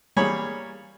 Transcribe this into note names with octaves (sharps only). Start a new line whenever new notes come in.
G3 A#3 G#4 C#5 B5